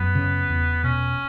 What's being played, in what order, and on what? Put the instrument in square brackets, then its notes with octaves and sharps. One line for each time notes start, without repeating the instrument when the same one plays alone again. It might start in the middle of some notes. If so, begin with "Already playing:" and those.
Already playing: [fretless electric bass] F#2 [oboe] B3
[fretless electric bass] C#3
E2
[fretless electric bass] B2 [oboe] C#4